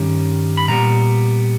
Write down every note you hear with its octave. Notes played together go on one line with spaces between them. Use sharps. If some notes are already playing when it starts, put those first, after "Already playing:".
Already playing: G2 D#3 G3 C#4
B5
A#2 G3 B3 A#5